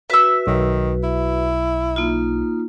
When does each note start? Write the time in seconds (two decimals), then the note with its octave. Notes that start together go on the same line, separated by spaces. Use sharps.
0.10 F#4 B4 E5 E6
0.47 B1 D#3
1.03 E4
1.96 A#3 D#4 F4